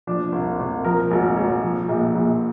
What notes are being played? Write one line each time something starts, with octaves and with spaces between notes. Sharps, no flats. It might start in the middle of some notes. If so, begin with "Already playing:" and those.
F3 D4
C2
C2
F3 A#4
G#1
G#1
F3
A#1
A#1